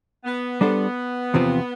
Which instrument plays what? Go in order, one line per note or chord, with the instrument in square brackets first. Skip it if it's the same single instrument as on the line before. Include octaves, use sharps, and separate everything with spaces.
[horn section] B3
[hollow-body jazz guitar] G3 D4 A4 C5 [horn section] B3
[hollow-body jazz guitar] E2 C3 F3 C4 F4